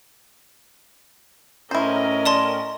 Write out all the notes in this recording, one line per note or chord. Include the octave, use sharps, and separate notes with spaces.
A2 C#4 E4 A#4 C5 D#5
D5 A5 C6